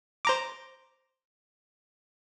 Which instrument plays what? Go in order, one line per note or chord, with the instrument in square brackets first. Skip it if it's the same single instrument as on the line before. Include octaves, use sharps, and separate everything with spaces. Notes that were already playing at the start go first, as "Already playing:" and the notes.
[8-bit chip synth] C5 A#5 D6